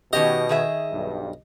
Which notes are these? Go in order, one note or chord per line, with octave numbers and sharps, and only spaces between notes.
B2 D#3 C#4 G4 D#5
D#3 G#4 E5
B1 G2